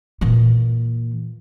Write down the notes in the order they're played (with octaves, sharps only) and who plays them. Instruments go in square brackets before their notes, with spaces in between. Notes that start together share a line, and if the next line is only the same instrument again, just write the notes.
[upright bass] A#2 E3